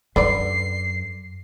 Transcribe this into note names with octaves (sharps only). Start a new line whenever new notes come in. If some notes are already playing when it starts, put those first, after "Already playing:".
F#2 D3 B4 D5 C7